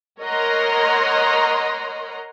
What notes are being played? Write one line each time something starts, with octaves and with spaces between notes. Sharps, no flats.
A#4 C#5 D#5 F#5 A#5 C6